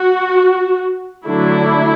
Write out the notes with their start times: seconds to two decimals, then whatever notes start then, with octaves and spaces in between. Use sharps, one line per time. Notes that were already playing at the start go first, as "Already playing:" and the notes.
Already playing: F#4
1.26 D3 F#3 A3 D4 E4